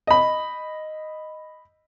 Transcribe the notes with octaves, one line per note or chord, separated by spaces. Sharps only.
D#5 B5